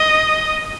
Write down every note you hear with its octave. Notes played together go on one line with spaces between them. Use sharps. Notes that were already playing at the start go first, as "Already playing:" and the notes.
Already playing: D#5